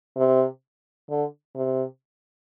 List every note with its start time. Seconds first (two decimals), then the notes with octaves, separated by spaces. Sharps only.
0.17 C3
1.09 D3
1.55 C3